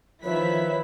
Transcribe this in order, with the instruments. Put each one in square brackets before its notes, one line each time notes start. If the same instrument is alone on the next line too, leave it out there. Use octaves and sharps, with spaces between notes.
[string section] D#3 E4 B6 [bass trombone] F3 [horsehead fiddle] B4 E5 [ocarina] C#5